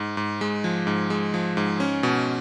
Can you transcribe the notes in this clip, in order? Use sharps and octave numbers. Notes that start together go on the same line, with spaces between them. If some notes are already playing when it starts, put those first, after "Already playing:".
Already playing: G#2
G#2
G#3
F3
G#2
G#3
F3
G#2
C#4
B2